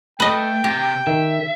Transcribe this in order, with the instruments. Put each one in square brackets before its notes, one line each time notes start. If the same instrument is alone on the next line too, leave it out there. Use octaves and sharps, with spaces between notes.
[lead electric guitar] A3 [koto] B4 D#5 [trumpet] G5
[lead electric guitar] C3 [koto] G4
[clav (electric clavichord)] D#3 [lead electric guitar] E5